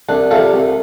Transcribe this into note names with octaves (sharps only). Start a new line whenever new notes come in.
C2 D4
C3 G3 F4 A4
C2